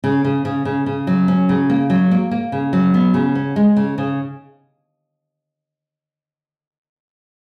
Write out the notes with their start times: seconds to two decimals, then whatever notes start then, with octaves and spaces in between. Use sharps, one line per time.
0.04 C#3
0.24 C#3
0.45 C#3
0.65 C#3
0.86 C#3
1.07 F#3
1.28 C#4
1.49 C#3
1.70 A#3
1.90 F#3
2.11 A#3
2.31 A#3
2.52 C#3
2.73 F#3
2.94 B3
3.14 C#3
3.35 C#4
3.56 G#3
3.76 C#3
3.98 C#3